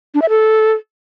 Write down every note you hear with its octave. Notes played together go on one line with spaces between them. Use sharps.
D4
E5
A4